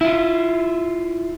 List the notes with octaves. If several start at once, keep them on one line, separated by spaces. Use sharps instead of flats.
E4 F4